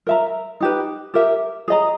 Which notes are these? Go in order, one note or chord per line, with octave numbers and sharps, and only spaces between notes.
A#4 E5 A#5
D#4 G4 B4
G4 A#4 E5
G#4 D#5 A#5